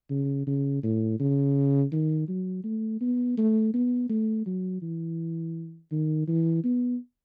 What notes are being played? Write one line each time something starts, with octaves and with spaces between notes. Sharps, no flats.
C#3
C#3
A2
C#3
D#3
F#3
A3
B3
A3
B3
A3
F#3
E3
D#3
E3
B3